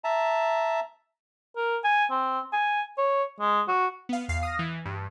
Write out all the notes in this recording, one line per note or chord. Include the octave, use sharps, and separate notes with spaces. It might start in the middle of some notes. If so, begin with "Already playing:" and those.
E5 A5 A#5
A#4
G#5
C4
G#5
C#5
G#3
F#4
B3 F5
E2 F5 C7
D#6 F6 A#6
E3
G2